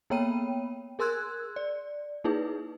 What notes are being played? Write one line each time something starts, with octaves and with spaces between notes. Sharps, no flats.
A#3 B3 C#5 G5 B5 D#7
G#4 A#4 C6 E6 F#6 G#6
D5
A#3 D#4 E4 G#4 B4